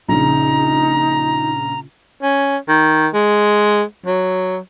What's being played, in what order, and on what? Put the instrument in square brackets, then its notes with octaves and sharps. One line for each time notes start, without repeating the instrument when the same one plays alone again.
[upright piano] A#1 C#3 [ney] D#4 [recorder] A#5
[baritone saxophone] C#4
D#3
G#3
F#3